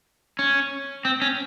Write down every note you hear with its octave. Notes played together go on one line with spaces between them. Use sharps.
C#4
C4
C#4